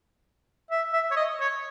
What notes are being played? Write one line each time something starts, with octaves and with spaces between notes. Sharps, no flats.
E5
E5
C#5
D#5
C#5